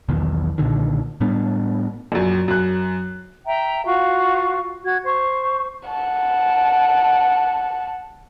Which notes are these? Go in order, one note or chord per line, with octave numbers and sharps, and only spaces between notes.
E1 B1 E2 D#3
B1 A#2 D3 D#3
A2 G3 B3 D4
A#1 F#2
F#2 F#6
E5 G5 A#5
F4 F#4 F5 C#6
F#4 G#6
C5 C#6
F#5 A5